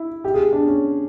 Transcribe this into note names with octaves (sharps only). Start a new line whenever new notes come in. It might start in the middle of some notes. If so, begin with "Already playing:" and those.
Already playing: E4
G4
G#4
D4
C#4